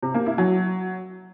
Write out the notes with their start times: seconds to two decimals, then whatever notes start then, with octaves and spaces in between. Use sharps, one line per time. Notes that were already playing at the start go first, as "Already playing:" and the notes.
0.03 C3
0.14 A#3
0.26 E4
0.38 F#3